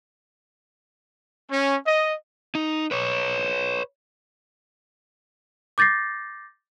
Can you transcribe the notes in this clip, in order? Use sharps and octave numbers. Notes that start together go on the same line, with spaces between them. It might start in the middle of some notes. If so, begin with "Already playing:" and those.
C#4
D#5
D#4
B4 C#5
D6 G6 A6 A#6 C7